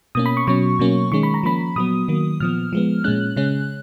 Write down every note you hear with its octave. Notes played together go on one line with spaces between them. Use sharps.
B2 A#3 C#4 D#6
B5
C#6
B2 F#3 C#4 C#6
B2 F#3 A#3 C#4
D#3 G#3 C#4 C#6
B5
A#5
F3 A#3 C#4 B5
A#2 F#3 B3 D#6
D#3 F#3 A#3
A#2 F3 B3 F6
F3 G#3 B3
A#2 G#3 C#4 F#6
C#3 G#3 C#4